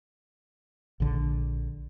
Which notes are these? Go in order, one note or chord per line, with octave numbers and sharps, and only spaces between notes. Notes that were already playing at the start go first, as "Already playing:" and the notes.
A#1 D3